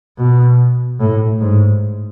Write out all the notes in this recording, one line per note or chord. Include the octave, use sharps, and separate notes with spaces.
B2
A2
G#2